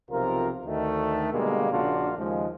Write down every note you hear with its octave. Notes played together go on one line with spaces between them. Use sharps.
B1 C3 F3 F4 A#4
D2 D#3 A3
B2 D3 G3 G#3 A#3
A#1 C#3 A#3 D4 F4 F#4
D#2 C#3 F3 G#3